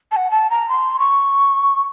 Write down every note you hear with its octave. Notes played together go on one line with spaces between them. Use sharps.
A5
F#5
A5
A#5
C6
C#6